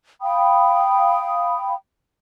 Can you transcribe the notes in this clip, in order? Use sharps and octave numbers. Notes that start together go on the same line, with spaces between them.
F5 G5 B5 D#6